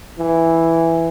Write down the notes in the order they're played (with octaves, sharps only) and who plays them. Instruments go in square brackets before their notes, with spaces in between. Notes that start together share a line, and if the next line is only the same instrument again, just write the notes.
[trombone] E3